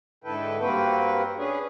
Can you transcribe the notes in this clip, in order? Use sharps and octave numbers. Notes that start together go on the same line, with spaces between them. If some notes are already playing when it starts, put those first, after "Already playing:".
G#2 D3 E4 A4 B4 G5
G2 A#3 C4 F#4 B4 G5
C#4 D4 G#4 B4